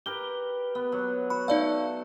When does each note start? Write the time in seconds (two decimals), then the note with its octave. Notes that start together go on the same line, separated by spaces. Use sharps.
0.06 G4 A#4 B4 G7
0.75 B3
0.92 F#3
1.30 F#4 B5
1.48 A3 D#4 D5 F5